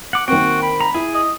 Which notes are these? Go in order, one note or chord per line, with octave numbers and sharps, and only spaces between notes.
F#5 D6
D#3 A#3 C4 F#4 G5
B5
A#5
E4 G#4
D#5